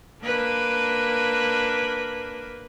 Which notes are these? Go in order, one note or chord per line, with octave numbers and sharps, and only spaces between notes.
A#3 D4 B4